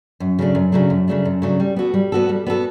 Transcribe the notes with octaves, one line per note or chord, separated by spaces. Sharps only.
F#2
C#3 F#3 A3 D4
F#2
C#3 F#3 A3 D4
F#2
C#3 F#3 A3 D4
F#2
C#3 F#3 A3 D4
G3
B3 F#4 A4
G3
B3 F#4 A4
G3
B3 F#4 A4